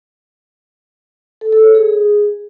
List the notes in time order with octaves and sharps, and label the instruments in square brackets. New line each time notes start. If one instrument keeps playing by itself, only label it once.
[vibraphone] A4
A4
C#5
G#4